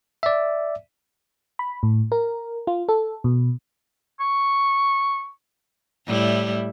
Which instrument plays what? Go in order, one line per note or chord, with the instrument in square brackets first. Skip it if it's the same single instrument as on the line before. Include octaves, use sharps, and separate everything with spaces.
[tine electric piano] D5 E5
[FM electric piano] B5
A2
A#4
F4
A4
B2
[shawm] C#6
[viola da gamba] A2 G3 E4